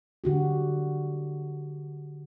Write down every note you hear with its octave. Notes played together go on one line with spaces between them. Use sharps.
D3 F#4 G4